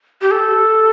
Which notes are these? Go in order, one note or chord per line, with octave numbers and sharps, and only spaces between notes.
G4
A4